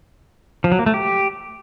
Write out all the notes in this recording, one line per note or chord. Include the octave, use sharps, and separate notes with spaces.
F3
F#3
A#3
A3
G4